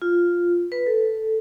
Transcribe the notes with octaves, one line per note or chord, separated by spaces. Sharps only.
F4
B4
A4